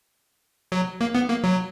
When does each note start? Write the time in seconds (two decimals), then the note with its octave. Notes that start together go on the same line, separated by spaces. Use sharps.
0.72 F#3
1.01 A#3
1.15 B3
1.29 A#3
1.44 F#3